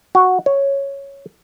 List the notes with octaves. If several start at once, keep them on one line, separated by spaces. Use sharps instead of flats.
F#4
C#5